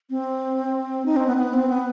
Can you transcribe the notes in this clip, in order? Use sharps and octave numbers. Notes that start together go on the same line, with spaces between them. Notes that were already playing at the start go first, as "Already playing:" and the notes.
C4
D#4
C4
B3
B3
C4
B3